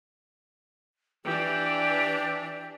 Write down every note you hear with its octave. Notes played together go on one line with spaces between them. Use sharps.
E3 D4 G4